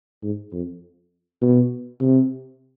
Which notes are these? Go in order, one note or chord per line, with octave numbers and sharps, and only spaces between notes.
G#2
F2
B2
C3